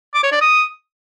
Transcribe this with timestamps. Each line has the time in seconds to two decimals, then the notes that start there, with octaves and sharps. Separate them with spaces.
0.14 D6
0.23 C#5
0.32 D5
0.41 D#6